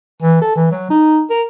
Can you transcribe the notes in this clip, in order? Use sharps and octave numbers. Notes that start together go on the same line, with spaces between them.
E3
A4
E3
F#3
D#4
A#4